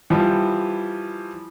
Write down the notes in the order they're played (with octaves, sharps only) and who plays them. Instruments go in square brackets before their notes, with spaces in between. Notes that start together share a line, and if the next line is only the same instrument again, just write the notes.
[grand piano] E3 F3 G3